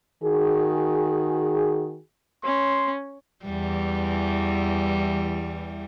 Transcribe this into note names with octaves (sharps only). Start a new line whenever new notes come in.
D#3 F#4 G#4
C#4 C6
E2 E3 G3